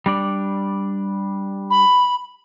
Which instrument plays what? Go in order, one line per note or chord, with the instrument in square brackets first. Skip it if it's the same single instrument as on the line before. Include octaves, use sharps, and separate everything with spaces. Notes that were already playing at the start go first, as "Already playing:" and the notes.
[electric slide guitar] G3 D4 D5
[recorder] B5